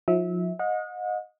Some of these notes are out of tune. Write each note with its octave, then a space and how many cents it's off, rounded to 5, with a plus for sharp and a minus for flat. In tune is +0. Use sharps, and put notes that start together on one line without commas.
F3 +35 E4 -35 E5 -25
D#5 +0 F#5 -40